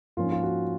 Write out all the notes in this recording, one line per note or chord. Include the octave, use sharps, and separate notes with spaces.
G#2 F3 A#3 C#4 F4
F4
F#4